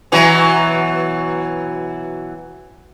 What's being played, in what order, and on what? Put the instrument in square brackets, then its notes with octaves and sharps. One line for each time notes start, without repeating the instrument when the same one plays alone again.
[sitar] B2 E3 F#3